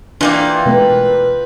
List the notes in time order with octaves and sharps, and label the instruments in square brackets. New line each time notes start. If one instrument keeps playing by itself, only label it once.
[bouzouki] E3 A#3 D5 [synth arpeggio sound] D4 A#4 [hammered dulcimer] F4 G5
[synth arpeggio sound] B2 G#3 A3 [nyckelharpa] B4